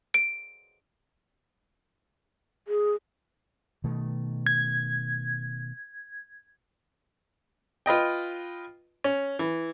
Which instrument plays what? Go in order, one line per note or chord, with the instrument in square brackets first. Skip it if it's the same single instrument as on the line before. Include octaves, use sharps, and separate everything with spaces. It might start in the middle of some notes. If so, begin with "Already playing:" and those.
[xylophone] D7
[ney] G#4
[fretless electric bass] B2 D#3 A3
[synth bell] G#6
[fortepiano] F4 B4 D#5 G5
C#4
E3